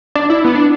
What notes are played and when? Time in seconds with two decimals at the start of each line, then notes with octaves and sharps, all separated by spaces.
0.15 D4
0.30 E4
0.44 B3
0.55 D4